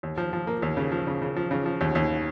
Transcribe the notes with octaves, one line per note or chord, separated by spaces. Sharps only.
D#2
F3
F3
A#3
D#2
C#3
F3
C#3
C#3
F3
C#3
F3
D#2
D#2